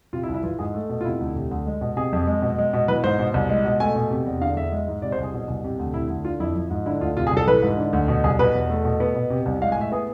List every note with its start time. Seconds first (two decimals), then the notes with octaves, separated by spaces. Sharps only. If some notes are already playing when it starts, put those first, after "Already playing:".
0.13 C3 F4
0.23 E4
0.29 C2
0.34 E4
0.44 E3 F4
0.59 G#2 G#4
0.74 A3
0.89 B2
1.01 F4
1.05 C3 E4
1.21 D2
1.36 C3
1.51 D2
1.66 G#3
1.81 B2
1.97 C3 G#4
2.13 F2
2.27 G#3
2.42 B2
2.58 G#3
2.73 B2
2.88 E3 B4
3.03 G#2 C5
3.19 B2
3.34 C2
3.49 G#3
3.65 B2
3.80 A3 G#5
3.95 B2
4.11 C3
4.26 E2
4.41 D3 F5
4.56 E2 E5
4.72 G#3
4.88 G#2
5.02 C3 D5
5.12 C5
5.18 C2
5.23 G#4
5.34 B2
5.48 C2
5.64 C3
5.79 D2
5.94 C3 E4
6.10 D2
6.25 D3 F4
6.40 F2 E4
6.55 F3
6.70 G#2
6.86 D3 E4
7.01 D2 F4
7.17 C3 F4
7.27 G#4
7.31 C2
7.37 A4
7.47 E3 B4
7.63 G#2
7.78 D3
7.93 D2
8.08 B2
8.24 C2 G#4
8.39 B2 B4
8.55 E2
8.70 A3
8.85 B2
9.00 B3
9.15 B2
9.30 C3
9.46 C2
9.61 G#3 F5
9.72 G#5
9.76 A2 E5
9.92 B3 G#4